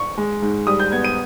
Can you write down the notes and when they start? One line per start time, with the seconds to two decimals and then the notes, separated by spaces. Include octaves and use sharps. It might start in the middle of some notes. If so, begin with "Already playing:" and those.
Already playing: C#6
0.18 G#3
0.42 G#2
0.67 G3 D#6
0.79 G6
0.92 B3 G#6
1.04 D#7